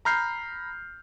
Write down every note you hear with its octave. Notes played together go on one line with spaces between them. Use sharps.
A#5 B5 F6 G6 C7